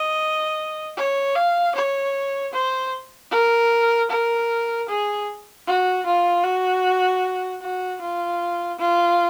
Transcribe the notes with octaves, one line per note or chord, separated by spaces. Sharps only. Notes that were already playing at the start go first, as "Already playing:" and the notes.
Already playing: D#5
C#5
F5
C#5
C5
A#4
A#4
G#4
F#4
F4
F#4
F#4
F4
F4